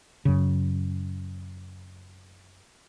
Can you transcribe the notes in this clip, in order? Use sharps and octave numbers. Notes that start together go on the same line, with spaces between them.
F#2 C#3